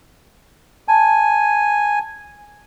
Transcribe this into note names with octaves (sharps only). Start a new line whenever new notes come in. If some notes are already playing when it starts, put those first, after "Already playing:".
G#5 A5